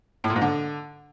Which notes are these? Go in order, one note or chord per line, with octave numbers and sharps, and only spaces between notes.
A2
A#2
G#2
D3